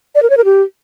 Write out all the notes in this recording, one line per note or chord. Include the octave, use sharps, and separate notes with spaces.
D5
A#4
C#5
A#4
G4